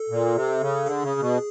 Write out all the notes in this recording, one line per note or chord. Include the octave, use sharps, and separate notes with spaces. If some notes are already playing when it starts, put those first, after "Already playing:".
Already playing: A4
A#2
C3
C#3
D3 G#4
C#3
B2